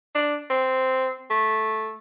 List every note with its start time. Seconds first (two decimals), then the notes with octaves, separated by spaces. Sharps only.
0.15 D4
0.50 C4
1.30 A3